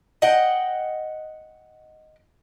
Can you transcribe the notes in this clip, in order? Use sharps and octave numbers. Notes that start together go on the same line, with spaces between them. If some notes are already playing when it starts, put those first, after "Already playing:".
D#5 F#5 G5